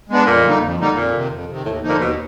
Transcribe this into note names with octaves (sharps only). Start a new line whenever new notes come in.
G#3 B3 D4
F2 A#2
D3 G3 A#3 D#4
F2
D3 G3 A#3 D#4
F2 A#2
C3 D#3
F2
C3 D#3
D#2 A2
D3 F3 A#3 D#4
A#2
D#2 B2